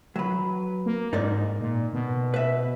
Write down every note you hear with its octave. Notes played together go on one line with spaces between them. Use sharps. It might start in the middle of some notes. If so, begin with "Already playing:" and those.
F#3 B4
A#3
G#2 D#4 A#4 D5
A#2
B2
B4 E5